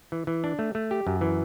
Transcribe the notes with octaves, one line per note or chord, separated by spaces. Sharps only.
E3
E3
D4
A3
A3
G4
F#2
E3